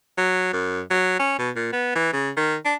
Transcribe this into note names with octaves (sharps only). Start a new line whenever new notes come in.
F#3
F#2
F#3
C#4
B2
A#2
B3
E3
C#3
D#3
D4